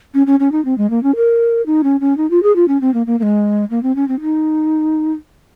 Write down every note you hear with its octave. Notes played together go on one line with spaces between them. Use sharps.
C#4
C#4
C#4
D#4
C4
G#3
A#3
C#4
A#4
D#4
C#4
C#4
D#4
F4
G#4
F4
C#4
C4
A#3
A#3
A#3
G#3
A#3
C4
C#4
C4
D#4